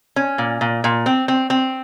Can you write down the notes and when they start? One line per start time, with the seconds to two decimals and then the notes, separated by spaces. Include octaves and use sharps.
0.16 C#4
0.38 A#2
0.61 A#2
0.84 A#2
1.06 C4
1.28 C4
1.50 C4